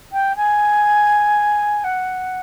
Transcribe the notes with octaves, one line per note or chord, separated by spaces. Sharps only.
G5
G#5
F#5